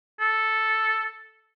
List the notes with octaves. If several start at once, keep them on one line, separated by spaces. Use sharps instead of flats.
A4